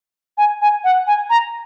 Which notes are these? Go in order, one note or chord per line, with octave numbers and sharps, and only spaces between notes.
G#5
G#5
F#5
G#5
A#5